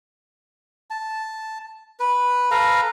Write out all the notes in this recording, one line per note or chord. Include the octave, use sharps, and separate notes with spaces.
A5
B4
A4 B4 F5 A#5